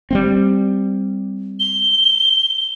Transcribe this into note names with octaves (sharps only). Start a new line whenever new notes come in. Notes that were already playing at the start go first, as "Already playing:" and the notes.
G3 A#3 C4
G7